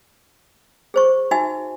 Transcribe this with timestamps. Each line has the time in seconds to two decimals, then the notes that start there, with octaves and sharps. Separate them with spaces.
0.94 G#4 C5 C#6
1.31 D#4 F#4 E5 G#5